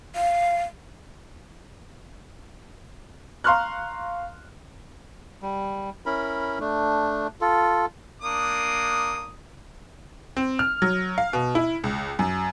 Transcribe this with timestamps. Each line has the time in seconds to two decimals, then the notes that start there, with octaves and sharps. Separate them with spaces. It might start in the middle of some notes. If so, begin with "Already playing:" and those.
0.16 F5
3.44 F5 A#5 C6 C#6 F6 F#6
5.42 G3
6.06 C#4 E4 A#4 B5
6.60 A3 D4
7.41 F4 A4
8.22 A#3 D4 D#6
10.37 C4
10.59 F6
10.82 F#3
11.18 F5
11.33 B2
11.55 E4
11.84 C#2
12.19 F#2